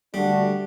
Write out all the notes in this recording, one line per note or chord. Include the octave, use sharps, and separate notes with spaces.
D3 G3 A3 D4 F#4